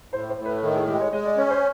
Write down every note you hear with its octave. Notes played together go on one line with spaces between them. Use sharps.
A2 C5
C5
A2
B4
D#3 A4
G#4
G#3 G4
C#5
G#3 D#5
D5
C#4 C#5
C5